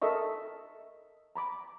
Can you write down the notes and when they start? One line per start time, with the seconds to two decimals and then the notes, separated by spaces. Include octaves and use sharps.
0.02 A4 A#4 D#5 E5 C#6
1.36 A#5 B5 D6